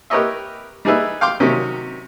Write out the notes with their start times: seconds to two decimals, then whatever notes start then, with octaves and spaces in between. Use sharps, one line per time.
0.10 G4 A#4 B4 C#5 D#5 E5
0.85 G3 D#4 G#4 B4 E5
1.21 F5 G5 C6 D6
1.40 C3 D#3 F#3 C#4